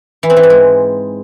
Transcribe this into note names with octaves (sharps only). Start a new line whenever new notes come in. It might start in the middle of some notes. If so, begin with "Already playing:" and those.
E3
C4
E3
G#2
G#3